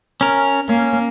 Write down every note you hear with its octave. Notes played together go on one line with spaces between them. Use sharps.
C#4 A#4
A#3 C#4